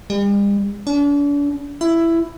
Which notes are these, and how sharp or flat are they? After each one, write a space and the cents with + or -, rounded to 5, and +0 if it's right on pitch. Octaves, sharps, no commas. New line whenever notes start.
G3 +45
D4 -40
E4 +10